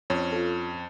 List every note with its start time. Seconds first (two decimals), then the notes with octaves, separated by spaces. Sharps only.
0.10 F2 C#4
0.32 F4 A4